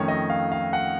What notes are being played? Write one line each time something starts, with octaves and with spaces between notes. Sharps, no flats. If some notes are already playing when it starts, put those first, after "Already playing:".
Already playing: F2 D#3 A3 C#4 C#5
D#5
F5
F5
F#5